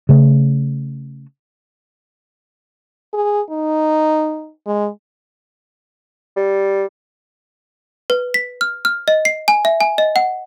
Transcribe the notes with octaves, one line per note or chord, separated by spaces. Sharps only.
C#3 A3
G#4
D#4
G#3
G3
B4
B6
F6
F6
D#5
C7
G#5
E5
G#5
D#5
F#5